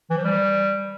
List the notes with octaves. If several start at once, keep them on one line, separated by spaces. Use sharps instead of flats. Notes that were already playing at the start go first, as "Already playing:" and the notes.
E3
F3
G3